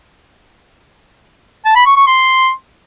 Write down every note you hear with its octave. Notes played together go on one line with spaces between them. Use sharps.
A5
B5
C#6
C#6
C6